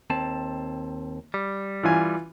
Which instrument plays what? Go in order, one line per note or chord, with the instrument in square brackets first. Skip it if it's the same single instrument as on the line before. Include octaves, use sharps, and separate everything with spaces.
[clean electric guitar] D#2 C4 A5
G3
[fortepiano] E3 F4 G#5